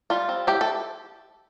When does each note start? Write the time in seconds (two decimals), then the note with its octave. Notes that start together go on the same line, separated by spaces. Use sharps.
0.10 G3 F4
0.29 C4
0.47 E4 G4
0.61 A4